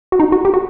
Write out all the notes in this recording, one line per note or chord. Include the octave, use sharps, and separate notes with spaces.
F#4
D#4
F#4
G4
F#4